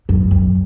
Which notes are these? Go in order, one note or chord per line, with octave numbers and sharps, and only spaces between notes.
F#2
F#2